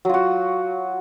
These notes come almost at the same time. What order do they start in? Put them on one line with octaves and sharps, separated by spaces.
F#3 F4 F#4